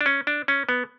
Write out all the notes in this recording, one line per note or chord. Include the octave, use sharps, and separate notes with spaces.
D4
C#4
D4
C#4
B3